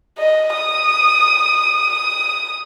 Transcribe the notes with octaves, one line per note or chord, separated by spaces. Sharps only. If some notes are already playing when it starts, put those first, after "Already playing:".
D#5
D#6
D#6